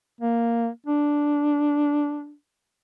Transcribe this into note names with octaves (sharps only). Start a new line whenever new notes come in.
A#3
D4